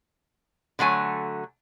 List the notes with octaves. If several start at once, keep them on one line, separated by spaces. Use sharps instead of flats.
D3 F#3 A3 G#5